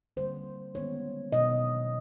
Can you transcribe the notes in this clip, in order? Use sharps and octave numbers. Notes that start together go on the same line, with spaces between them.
D3 G3 A#3 C5
D#3 G#3 B3 C#5
B2 F#3 B3 D#5